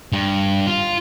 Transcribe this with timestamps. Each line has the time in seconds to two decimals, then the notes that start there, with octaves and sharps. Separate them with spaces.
0.12 G2
0.67 F4